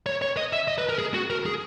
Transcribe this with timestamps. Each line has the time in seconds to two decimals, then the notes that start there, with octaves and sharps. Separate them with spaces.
0.06 C#5
0.22 C#5
0.37 D#5
0.53 E5
0.68 D#5
0.78 B4
0.89 A#4
0.99 G#4
1.14 F#4
1.30 A#4
1.46 G#4